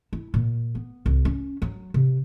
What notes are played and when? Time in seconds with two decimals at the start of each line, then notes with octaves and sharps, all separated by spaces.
0.13 E4
0.34 A#2
0.75 B3
1.06 C2
1.25 C#4
1.62 F#3
1.94 C3